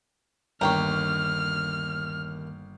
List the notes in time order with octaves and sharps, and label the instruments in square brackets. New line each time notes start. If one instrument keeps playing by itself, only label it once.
[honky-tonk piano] G1 [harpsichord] D#2 [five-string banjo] C#5 G5 A#5 [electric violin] F6